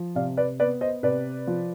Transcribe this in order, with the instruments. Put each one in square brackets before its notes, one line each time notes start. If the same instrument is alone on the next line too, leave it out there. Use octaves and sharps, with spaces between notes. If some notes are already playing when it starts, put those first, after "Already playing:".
Already playing: [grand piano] F3
C3 D5 F5
B4 D5
B3 B4 D5
C5 D#5
C3 B4 D5
F3